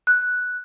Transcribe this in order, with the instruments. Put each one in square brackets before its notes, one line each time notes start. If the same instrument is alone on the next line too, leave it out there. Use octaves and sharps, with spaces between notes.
[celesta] F#6